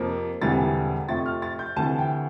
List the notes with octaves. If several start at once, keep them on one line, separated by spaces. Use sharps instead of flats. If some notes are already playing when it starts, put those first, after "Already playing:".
Already playing: F2 C3 F3 A#3
E1 D2 C3 E3 G3 A6
F2 C3 F3 A3 C4 A6
F6
A6
G6
D2 C3 E3 A5
G5